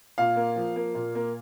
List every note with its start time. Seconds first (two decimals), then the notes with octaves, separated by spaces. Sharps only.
0.18 A#2 F5
0.36 A#3
0.56 F3
0.76 A#3
0.95 A#2
1.15 A#3